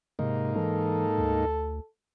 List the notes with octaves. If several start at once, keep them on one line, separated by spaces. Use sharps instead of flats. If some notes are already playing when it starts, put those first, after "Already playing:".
G#2 C3 A#3 D#4
E3 A4
D2